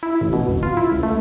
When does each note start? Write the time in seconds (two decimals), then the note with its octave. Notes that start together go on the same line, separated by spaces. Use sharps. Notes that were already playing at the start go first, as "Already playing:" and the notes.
0.03 E4
0.21 A1
0.33 B2
0.48 D1
0.63 F4
0.77 E4
0.91 C#2
1.03 A3